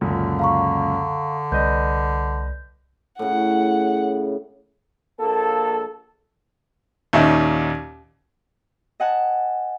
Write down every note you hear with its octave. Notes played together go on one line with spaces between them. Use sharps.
C#2 F#2 A#2 D3
F5 A#5 C#6
C2 B4 D5 D#5 G6
A2 C#3 F#5
A#1 A#3 A4 A5
D#2 A#2 C#4 D#4 E5
D#5 F#5 G#5 A5